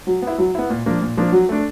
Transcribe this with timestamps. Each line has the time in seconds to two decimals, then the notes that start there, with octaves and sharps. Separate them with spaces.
0.07 F#3
0.22 B3
0.27 E4
0.38 F#3
0.55 B3 E4
0.70 A#2
0.86 F3 A#3 D4
1.02 A#2
1.17 F3 A#3 D4
1.32 F#3
1.49 A3 D4